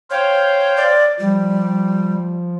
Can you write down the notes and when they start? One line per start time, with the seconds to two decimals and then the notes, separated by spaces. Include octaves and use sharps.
0.11 C5 C#5 F5 G5
0.77 D5
1.20 F3 G3